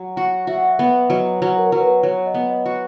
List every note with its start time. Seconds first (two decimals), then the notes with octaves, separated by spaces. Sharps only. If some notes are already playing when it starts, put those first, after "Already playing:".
Already playing: F#3
0.16 F#4 F#5
0.47 F#4 E5
0.57 F#5
0.67 E5
0.79 B3 E5
1.10 F#3 D#5
1.42 F#3
1.57 A#4
1.72 F#3
1.80 B4
2.03 F#3 C#5
2.26 D#5
2.34 B3
2.50 D#5
2.66 F#4